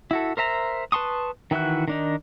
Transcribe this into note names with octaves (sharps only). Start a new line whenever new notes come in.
E4 F#4 A4
A#4 C5 E5 A#5
B4 A5 C6 C#6 D#6
D#3 E3 E4 F#4 F#6
D#3 D4 D#4